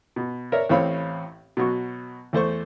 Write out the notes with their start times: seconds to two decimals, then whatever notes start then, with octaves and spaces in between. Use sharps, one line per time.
0.16 B2
0.52 A#4 C#5 D5 E5
0.69 A1 A2 C4 C#5 F5 B5
1.57 B2 F#3 C#6
2.33 E2 A3 C5 C#6